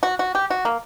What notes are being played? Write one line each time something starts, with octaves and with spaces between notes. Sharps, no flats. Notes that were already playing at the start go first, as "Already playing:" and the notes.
F#4
F#4
G4
F#4
A#3